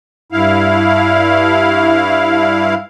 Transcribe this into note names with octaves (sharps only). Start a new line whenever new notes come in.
G2 E4 F5